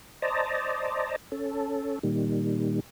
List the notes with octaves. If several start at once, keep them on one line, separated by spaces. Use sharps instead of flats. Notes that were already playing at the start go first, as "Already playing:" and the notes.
C5 D5 D#5 A5 A#5
C#4 A4
A#2 D#3 G3